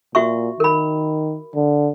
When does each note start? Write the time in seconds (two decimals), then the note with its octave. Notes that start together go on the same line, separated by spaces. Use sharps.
0.15 A#2 F#4 E5 C#6
0.60 D#3 A#4 B5
1.56 D3